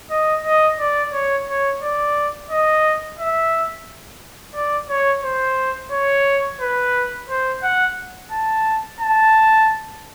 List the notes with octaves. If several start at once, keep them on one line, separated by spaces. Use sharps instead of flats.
D#5
D#5
D5
C#5
C#5
D5
D#5
E5
D5
C#5
C5
C#5
B4
C5
F#5
A5
A5